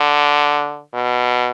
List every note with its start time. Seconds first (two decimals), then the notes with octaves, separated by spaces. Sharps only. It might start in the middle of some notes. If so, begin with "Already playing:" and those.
Already playing: D3
0.94 B2